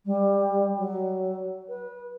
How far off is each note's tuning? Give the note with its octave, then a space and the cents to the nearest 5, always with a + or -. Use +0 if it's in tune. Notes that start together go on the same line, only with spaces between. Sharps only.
G3 +20
F#3 +20
B4 -25